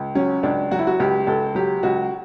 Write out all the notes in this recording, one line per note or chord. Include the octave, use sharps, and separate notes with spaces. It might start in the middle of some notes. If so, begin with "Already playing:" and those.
Already playing: C#2
F#3 C#4
C#2 D4
F#3 F#4
E4
F#4
C#2 G4
C#2 A4
F#3 G4
C#2 F#4